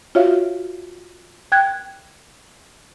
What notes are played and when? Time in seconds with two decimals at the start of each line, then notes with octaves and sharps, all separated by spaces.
0.15 F4 F#4 C#5 E5 F5
1.52 G5 F#6 G#6